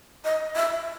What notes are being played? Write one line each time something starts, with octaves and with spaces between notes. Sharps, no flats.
D#5
E5